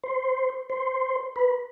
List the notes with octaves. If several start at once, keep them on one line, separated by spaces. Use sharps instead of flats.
C5
C5
B4